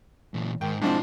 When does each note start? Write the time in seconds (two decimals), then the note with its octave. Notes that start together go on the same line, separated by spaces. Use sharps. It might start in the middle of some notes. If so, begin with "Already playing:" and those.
0.34 A#2 E3
0.61 G#2 D#3 G5
0.82 G#2 F3 C4 D4 E4 G5